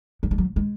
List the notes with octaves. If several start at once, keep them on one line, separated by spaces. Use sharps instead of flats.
F#3
G#3
F#3
G#3